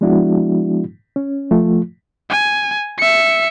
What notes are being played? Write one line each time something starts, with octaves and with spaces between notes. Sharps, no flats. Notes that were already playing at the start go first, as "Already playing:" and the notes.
F3 G#3 B3 D4 E4 F#4
C#4
F3 A3 F4
G#5
E5 C#7